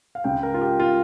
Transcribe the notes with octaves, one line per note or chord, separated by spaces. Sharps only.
F5
C#2 C#3 G#3 G5
A#4
F4
G4
F4